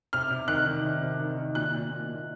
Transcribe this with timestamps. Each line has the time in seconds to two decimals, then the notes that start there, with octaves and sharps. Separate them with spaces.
0.13 C3 F6
0.30 C3
0.48 D#3 F#6
0.66 D#3
0.84 C3
1.02 C3
1.20 D#3
1.37 D#3
1.55 A#2 F#6
1.73 A#2
1.91 A#2
2.08 A#2